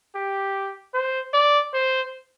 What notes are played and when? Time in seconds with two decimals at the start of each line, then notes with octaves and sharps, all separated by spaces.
0.15 G4
0.94 C5
1.34 D5
1.74 C5